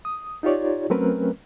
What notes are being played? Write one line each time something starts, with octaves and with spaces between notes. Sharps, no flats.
D#6
D#4 F4 G4 C#5 D5
F#3 A3 C4 C#4 A#4 B4